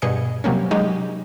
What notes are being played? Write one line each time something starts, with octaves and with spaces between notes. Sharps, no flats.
G2 B2 B3 G#4 D#5 C#7
C3 F#3 G3 A#3 C#4
F#3 G#3 D#4 G4